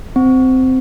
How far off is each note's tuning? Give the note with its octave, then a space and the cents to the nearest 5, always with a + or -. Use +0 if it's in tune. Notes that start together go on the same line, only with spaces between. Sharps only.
C4 -15